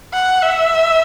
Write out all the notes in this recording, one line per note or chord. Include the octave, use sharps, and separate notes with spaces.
F#5
E5